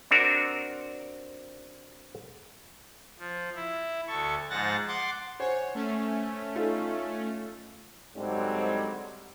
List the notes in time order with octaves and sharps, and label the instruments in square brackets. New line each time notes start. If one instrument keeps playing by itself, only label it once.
[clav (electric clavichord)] C4 D4 F#4 A#4
[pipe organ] F3
E4
D2 A4 C#6
G#2 F3 F#5 A6 A#6
F#5 C6 D6 A6
[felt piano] C5 F#5 G#5 [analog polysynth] C#5
[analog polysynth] A3 C#4
[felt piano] D#4 F4 A4
[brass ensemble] G#2 D3 F#3 G3 C4